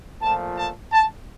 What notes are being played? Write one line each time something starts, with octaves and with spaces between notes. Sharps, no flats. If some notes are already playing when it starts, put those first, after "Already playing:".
A#2 F3 A3 A5
A5
A5